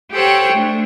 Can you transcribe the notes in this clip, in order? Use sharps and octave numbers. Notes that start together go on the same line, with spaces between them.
G4 A4 C5 C#5 F#5 G5
A3 D4